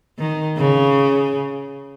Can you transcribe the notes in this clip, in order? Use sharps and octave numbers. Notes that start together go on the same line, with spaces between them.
D#3
C#3